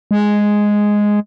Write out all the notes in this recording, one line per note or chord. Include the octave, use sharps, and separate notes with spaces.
G#3